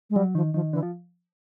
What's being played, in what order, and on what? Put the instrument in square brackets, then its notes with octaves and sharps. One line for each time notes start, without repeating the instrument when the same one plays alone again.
[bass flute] G#3
[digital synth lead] F#3 [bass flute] G3
[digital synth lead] D#3 [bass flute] F3
[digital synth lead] D#3 [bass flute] F3
[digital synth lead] D3 [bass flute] E3
[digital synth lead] F3